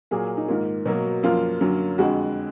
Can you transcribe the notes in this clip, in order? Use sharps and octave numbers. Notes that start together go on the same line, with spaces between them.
A#2 F#3 A#3 G#4
D#4
G#2 D#3 A#3 F4
B2 F#3 A#3
F#2 F3 A#3 F4
F#2 D3 F#3 A#3
F2 D3 G#3 F#4